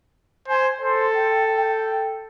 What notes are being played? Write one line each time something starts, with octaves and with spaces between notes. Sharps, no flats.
C5 G#5
A4 C5
G5
G5